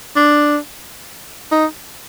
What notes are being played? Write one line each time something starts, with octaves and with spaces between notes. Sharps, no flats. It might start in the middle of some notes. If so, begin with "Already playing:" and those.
D4
D#4